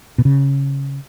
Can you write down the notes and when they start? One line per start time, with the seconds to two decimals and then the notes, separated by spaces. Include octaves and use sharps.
0.18 B2
0.25 C#3